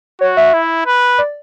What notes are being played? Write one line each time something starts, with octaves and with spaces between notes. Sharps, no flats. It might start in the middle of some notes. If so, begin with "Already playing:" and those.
F#4 C#5
E5
E4
B4
D5